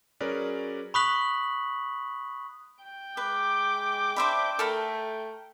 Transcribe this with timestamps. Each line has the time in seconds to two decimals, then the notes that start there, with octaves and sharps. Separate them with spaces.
0.20 F#3 C#4 G#4 A#4 B4 D5
0.94 B5 C#6 D#6 F#6 B6 F#7
2.83 G5
3.17 G#3 B4 D6
4.16 D4 C5 E5 B5
4.59 A3 A4 A#4 B5